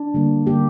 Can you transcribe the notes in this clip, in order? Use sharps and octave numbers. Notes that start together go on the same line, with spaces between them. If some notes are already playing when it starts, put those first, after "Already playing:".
Already playing: D4
D3 G3 A#3
D3 G3 A#3 G4